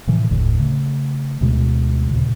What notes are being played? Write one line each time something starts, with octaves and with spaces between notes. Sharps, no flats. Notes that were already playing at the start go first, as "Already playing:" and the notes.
A2 C3 E3 F3
F1 D2 A2 D3
C#3 A3
D2 B2 G#3
D#2 A#2 C#3